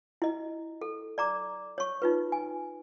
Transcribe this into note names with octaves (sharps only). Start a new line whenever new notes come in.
E4 D#5
A4
D5 A#5 D6
C#5 C#6
D#4 F4 B4
G#5